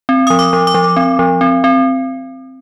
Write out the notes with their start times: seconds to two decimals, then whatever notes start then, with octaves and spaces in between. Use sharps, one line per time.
0.09 C4
0.27 F3 D#6
0.39 D6
0.53 F3
0.67 D6
0.74 F3
0.96 C4
1.19 F3
1.41 C4
1.64 C4